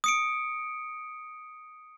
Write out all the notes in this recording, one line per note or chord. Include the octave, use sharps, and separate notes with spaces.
D#6 C#7 D7